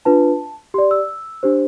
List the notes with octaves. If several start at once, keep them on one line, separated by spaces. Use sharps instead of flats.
D4 F4 B4 A5
G4 D5 C6
E6
D4 G4 C5